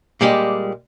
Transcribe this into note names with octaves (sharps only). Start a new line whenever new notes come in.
A#2 G3 G#3 G4